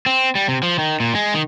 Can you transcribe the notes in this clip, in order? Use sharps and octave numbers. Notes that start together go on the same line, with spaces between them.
C4
G3
C3
F3
D#3
A#2
G#3
D#3